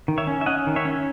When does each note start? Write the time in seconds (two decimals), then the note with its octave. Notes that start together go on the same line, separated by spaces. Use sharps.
0.08 D#3
0.18 C#5 E5
0.27 C#4
0.41 E5
0.46 C#4 D#5 F#5
0.67 D#3
0.76 C#5 E5
0.85 C#4